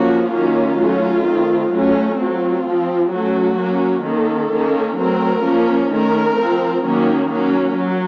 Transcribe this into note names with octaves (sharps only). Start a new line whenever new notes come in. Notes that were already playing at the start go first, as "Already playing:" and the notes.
Already playing: F3 A#3 C#4 F#4
D#3 F#3 A#3 C#4 F4
F#3 A3 C#4
D#3 A3 C4
F#3 A3 C#4
F#3 C4 F4
F3
C4
F#3 A3 C#4 F#4
F#3 A#3 C#4
D#3 A#3 C#4 A4
D#3 A#3 C#4
F#3 A3 C4 A#4
F3 A#3 C#4
D#3 A3 C#4 A#4
F3 C4
D#3 F#3 A#3 C#4
F#3 A#3 C#4
F#3